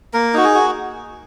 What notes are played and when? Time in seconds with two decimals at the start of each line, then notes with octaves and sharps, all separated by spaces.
0.14 A#3 A#4
0.34 D#4 F#4
0.44 G#4
0.55 F#4